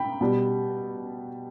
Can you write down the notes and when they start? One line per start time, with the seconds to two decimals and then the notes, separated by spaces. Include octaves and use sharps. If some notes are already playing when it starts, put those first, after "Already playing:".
Already playing: G5 B5
0.21 B2 G3